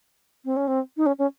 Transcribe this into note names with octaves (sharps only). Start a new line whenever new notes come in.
C4
C#4
C4
D#4
C#4
C#4